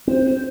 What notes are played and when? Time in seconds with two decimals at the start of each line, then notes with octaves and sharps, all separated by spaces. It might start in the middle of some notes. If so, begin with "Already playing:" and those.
0.07 C4 C5
0.25 C5